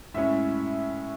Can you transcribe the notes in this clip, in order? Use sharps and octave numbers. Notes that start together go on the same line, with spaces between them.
A2 G#3 C#4 E4 E5